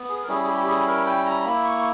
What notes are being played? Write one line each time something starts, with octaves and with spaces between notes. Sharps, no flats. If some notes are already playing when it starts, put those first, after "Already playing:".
Already playing: B3
G#4
A#4
G3 C#4 E4 G#4
G#4
G4
G4
G#4
A#4
G5
A#5
A#3 E4 B5
C#6
C#6